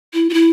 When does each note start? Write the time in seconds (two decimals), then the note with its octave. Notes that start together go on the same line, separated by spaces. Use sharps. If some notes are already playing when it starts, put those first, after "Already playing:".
0.14 E4
0.30 F4
0.34 E4